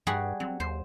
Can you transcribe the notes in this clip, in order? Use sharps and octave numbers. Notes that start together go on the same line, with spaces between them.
G2 G3 F#4 G#4
F#3 C4
D#2 C5